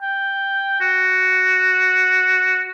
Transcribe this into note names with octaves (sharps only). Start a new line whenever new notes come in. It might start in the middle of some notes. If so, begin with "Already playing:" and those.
G5
F#4